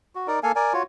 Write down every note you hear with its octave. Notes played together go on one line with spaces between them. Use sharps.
F#4
D#4 A#4 D5
A#3 A4 F5 G#5
A#4 D5 G#5
F4 F#4 C#5